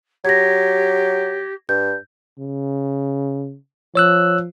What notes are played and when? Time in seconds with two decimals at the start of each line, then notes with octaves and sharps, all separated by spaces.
0.25 F#3 G4 G#6 A#6
1.69 G2 G6
2.39 C#3
3.95 F3 C#5 E6 F#6